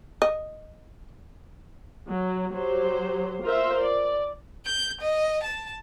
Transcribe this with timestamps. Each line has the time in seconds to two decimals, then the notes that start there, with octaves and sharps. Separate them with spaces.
0.22 D#5
2.09 F#3
2.52 F#3 G4 C5
3.42 F4 A#4 C5 E5
3.79 D5
4.66 G6
5.01 D#5
5.43 A5